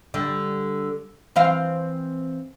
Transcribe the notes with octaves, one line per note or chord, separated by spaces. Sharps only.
D3 G3
E3 C4 F5